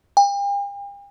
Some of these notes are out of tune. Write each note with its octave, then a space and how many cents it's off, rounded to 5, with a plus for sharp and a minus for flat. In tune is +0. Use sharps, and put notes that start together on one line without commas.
G5 +45